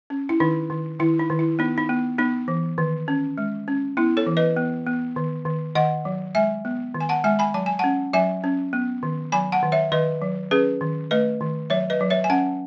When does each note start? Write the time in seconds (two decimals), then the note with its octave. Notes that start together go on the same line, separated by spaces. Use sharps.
0.10 C#4
0.29 E4
0.40 D#3 D#4
0.70 D#3
0.99 D#3 E4
1.19 D#4
1.30 D#3
1.39 E4
1.59 B3 D#4
1.78 D#4
1.89 B3
2.18 B3 D#4
2.48 E3
2.78 D#3
3.08 C#4
3.38 G#3
3.68 C#4
3.97 B3 E4
4.17 A4 C#5
4.27 E3
4.37 B4 D#5
4.56 B3
4.87 B3
5.16 D#3
5.45 D#3
5.75 D#3 D#5 F#5
6.05 F#3
6.35 G#3 E5 G#5
6.65 B3
6.94 D#3
7.01 G#5
7.09 F#5 A5
7.24 G#3 E5 G#5
7.39 G#5 B5
7.54 F#3 A5
7.66 G#5
7.79 C#4 F#5 A5
8.13 F#3 E5 G#5
8.44 C#4
8.73 B3
9.03 D#3
9.32 F#3 G#5 B5
9.52 F#5 A5
9.63 D#3
9.72 C#5 E5
9.92 D#3 B4 D#5
10.22 F#3
10.51 C#4 G#4 B4
10.81 D#3
11.11 A3 B4 D#5
11.41 D#3
11.70 F#3 C#5 E5
11.90 B4 D#5
12.01 F#3
12.10 C#5 E5
12.24 G#5
12.30 C#4 F#5 A5